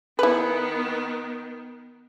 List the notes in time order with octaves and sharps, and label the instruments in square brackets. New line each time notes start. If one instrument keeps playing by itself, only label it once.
[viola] D#3 B3 [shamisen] E4 B4